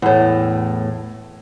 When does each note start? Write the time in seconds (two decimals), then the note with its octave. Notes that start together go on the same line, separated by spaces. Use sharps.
0.02 E2 A2